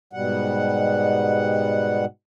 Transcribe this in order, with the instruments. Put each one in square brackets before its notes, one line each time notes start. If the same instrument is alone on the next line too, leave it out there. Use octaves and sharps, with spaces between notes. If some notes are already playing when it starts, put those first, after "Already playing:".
[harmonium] G#2 B2 G3 F#5